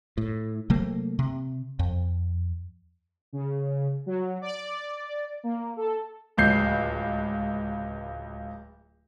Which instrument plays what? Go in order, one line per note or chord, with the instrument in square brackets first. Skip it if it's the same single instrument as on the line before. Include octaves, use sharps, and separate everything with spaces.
[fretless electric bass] A2
C3 F#3 A3 A#3
C3
F2
[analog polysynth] C#3
F#3
D5
A#3
A4
[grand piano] D1 C#2 G6 C7